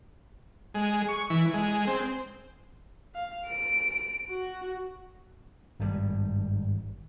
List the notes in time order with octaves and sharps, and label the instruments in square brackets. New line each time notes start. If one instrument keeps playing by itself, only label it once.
[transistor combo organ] G#3
C#6
E3
G#3
C4
[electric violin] F5
D7
F#4
[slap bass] G#1 G2 C3 G3